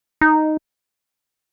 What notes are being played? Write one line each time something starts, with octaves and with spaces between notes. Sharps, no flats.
D#4